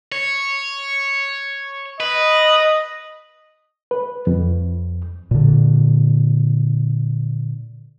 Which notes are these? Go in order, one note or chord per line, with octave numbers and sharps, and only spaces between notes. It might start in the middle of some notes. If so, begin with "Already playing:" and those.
C#5
B4 D#5
B4
F2
A#2 D3